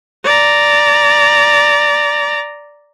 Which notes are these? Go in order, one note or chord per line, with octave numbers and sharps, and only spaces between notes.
D5 A#5